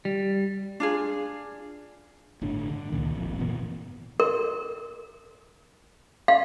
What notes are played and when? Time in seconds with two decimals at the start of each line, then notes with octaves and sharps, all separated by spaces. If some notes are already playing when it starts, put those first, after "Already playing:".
0.05 G3
0.80 D4 F4 G#4
2.41 G1 A2 D3 D4
2.70 D3
2.92 C#2 A#2 D#3
3.15 D1 G#1 F3
3.39 F#1 A#2 E3 B3
4.20 A#4
6.28 F5